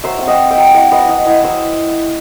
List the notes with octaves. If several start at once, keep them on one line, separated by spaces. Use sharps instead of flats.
F#3 C5 E5
C4 E5
D#5 F#5
C4
E5 G5
F#3
E4 D#5 F#5
F#3 B4 D#5
F#3 D#5 F#5
E4 D#5 F#5
F#3 C5 E5